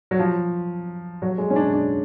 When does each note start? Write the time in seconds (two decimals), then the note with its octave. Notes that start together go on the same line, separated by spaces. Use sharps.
0.11 F#3
0.19 F3
1.22 F#3
1.38 G#3
1.50 C#4
1.56 D4
1.73 D4